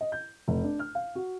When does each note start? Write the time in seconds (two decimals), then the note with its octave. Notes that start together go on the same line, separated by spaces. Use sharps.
0.01 D#5
0.12 G6
0.48 F1
0.64 D4
0.79 F6
0.95 F5
1.15 F#4